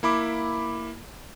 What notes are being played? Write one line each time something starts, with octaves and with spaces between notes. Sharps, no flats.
A#3 E4 B5 D6